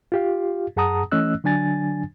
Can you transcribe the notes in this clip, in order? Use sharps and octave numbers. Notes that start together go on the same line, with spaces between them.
F4 G4 F5
F#2 G#4 F#5 A5 A#5 D#6
E3 A3 C#4 D#5 E6 F#6
D3 F#3 D4 G#5 A6